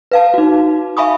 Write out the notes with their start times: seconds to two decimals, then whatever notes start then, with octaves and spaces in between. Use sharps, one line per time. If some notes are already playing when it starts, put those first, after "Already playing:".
0.11 B4 F5 A5
0.34 D#4 F#4
0.97 E5 F5 G#5 B5 C#6 D#6